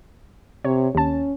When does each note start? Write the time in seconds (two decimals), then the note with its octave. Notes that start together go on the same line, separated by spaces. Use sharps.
0.64 C3 C#5
0.95 D#2 C#4 A5